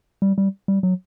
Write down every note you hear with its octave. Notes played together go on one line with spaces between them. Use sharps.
G3
G3
G3
F#3